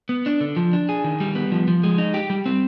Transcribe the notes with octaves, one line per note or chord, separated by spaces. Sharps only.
B3
D4
D3
F3
D4
G#4
D#3
G3
B3
F3
F3
G#3
D#4
G4
G3
C4